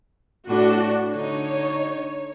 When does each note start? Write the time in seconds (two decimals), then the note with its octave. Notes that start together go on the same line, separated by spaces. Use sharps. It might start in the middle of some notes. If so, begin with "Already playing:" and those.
0.48 A2 D4 F#4
1.13 D3 D#4 C#5